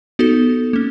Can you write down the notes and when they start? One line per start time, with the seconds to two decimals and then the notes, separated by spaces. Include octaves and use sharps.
0.19 B3 D#4 F#4 A4
0.73 A#3 C#4